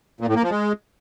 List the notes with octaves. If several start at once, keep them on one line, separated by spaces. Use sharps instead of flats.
A#2
A2
A#3
F3
G#3